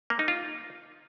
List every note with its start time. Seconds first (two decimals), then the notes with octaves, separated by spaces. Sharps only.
0.10 A#3
0.19 D#4
0.28 F4